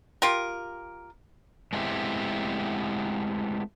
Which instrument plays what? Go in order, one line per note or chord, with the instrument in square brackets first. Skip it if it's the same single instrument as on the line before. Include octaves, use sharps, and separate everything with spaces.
[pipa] F4 G4 A#4
[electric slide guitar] G#3 A3 B3 C4 E4 G4